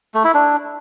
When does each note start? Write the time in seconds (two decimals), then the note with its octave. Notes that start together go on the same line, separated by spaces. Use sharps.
0.14 A3
0.24 E4
0.34 D4